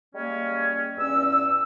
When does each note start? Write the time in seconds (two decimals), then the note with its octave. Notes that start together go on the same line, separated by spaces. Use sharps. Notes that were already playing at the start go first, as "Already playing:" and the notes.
0.14 G3 G#3 A#3 C#4 G#4
0.97 E2 G2 C#4 E6